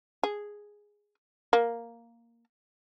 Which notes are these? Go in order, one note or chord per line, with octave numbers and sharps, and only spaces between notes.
G#4
A#3